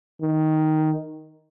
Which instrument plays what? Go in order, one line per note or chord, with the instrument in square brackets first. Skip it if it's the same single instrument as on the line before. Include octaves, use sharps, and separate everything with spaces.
[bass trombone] D#3